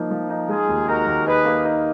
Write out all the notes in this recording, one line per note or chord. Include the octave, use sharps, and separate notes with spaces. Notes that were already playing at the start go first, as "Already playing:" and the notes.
Already playing: F3 A#3 D#4
F3
D#4
G#3 F4 G#4
D#2
D#4 F#4 A#4
D#2
D#4 G#4 B4
A#3
D#4